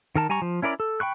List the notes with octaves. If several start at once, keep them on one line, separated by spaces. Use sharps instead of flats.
D#3 A#4 A5
G3 G#5 A#5 C#6
F3
C#4 E4 A#4 D5 B5
A4
G5 B5 C#6 F#6